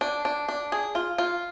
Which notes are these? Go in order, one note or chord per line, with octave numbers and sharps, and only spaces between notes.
D4
D4
D4
G#4
F4
F4